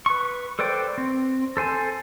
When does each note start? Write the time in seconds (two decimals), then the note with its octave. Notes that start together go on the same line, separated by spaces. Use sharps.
0.06 B4 C#6
0.59 A4 B4 C5 D5 G5
0.98 C4
1.57 A4 C5 G#5 A5